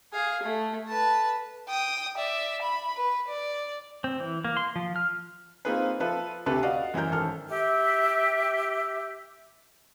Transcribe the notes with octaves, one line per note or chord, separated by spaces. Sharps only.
G#4 F5
A3
B4 A5
G5 D#6
D5 E5
B5
B4
D5
C4
E3
A#3
C6
F3
F6
A#3 C4 D#4 F4 G#4 B4
F3 F4 A4 B4 E5
D2 C3 G4 A4 B4 A5
F#4 D5 D#5 F5
F#2 E3 F#3 A#4 A#5 G6
G#1 A4 F6
G4 E5